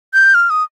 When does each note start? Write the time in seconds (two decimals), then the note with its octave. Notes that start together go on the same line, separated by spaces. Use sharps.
0.14 G6
0.34 F6
0.50 D#6